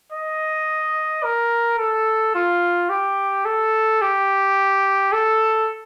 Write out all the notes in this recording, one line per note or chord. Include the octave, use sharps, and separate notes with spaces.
D#5
A#4
A4
F4
G4
A4
G4
A4